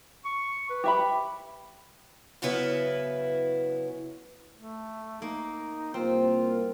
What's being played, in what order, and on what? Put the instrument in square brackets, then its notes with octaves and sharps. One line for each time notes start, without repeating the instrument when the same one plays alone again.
[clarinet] C#6
B4
[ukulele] G4 E5 B5
[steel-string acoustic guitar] F#2 C#3 B3 E4 B4
[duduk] A3
[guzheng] A#3 [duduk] D#4
[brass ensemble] C2 A#3 [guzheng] C4 [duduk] F4